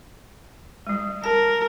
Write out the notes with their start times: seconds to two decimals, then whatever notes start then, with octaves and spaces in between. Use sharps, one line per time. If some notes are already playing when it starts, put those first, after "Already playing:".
0.87 G3 G#3
1.24 A#4 A5